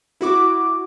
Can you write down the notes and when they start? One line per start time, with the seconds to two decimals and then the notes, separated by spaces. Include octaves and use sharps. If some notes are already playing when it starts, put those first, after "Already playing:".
0.21 E4 F#4 D6